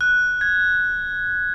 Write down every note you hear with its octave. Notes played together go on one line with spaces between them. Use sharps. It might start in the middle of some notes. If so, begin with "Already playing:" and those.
F#6
G#6